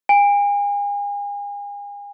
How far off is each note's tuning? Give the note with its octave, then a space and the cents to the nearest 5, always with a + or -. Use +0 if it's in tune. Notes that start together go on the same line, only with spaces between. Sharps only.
G#5 -40